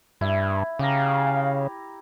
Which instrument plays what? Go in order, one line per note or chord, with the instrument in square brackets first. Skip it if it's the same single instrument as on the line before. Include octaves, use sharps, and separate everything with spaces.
[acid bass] G2 [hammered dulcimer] E4
[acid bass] C#3 [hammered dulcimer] G4 A#5 [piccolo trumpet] F5